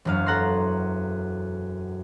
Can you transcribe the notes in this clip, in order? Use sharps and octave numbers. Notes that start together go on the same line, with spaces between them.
E1 F#2 F5
A4 F#5 A#5 C6